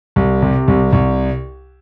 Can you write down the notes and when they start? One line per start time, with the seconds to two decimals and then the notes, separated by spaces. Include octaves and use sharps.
0.16 C2
0.42 C3
0.68 C2
0.93 C2